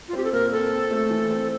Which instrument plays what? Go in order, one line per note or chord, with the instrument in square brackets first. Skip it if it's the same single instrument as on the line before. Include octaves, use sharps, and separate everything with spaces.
[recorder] F4
[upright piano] C4 [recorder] G4
[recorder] A4
[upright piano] A#2 [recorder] A#4
[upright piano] C4 [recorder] A4
[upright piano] C4
A3
E3
C4